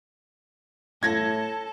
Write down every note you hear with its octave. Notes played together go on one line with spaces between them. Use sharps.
A2 A4 A5 G#6 A#6